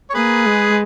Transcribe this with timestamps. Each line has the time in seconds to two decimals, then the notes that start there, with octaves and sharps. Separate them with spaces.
0.10 C#5
0.15 A#3 G#4 B4
0.46 G#3